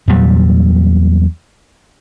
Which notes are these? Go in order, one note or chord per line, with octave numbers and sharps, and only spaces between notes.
E2 A#2 F#3 G3